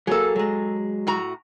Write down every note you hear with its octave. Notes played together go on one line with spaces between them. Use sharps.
F#3 A#3 G#4 A4
F#3 G#3
A2 F#4 A#5